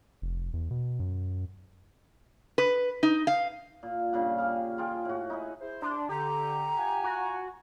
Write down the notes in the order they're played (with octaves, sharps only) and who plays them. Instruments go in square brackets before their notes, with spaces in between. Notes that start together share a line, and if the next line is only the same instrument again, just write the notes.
[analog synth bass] F1
E2
B2
F#2
[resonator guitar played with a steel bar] B4
D#4
F5
[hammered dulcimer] A#2
G2 A#2 C#3 F#5
G4 G#4 F5
F4 G#4 G5 D6
A2 F#4
D#4 E4 G#4
[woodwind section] E4 G#4 C5
[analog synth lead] D4 [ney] C6
[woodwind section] D3 [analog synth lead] G4 [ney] A#5
[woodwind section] F4 F#5 G#5
[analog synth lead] F#4